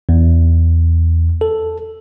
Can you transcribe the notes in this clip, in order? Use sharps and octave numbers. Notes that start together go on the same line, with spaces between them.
E2
A4